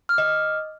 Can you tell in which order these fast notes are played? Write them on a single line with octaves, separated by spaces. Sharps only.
F6 D6 D#5